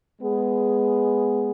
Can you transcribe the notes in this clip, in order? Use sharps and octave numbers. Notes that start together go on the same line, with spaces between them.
G#3 B3 G#4